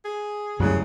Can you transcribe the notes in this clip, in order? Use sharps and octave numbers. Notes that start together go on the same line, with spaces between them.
G#4
D1 C2 F#2 C#3 F#3 G#3 F#6